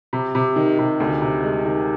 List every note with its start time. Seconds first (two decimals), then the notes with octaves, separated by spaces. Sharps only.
0.13 C3
0.35 C3
0.56 D#3
0.78 C3
1.00 D2
1.21 C3
1.43 G#3
1.65 D#3